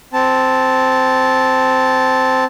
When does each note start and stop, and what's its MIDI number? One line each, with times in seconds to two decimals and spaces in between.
0.13 2.44 60
0.13 2.44 81